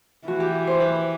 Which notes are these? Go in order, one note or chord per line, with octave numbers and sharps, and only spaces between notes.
E3 F#4
G4
C5
B4